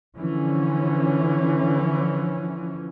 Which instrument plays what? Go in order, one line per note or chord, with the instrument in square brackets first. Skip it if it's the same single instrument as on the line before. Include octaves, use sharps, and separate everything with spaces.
[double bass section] D3 E3 F3 C#4